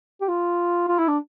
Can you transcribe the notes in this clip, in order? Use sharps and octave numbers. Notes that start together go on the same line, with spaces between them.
G4
F4
F4
E4
D4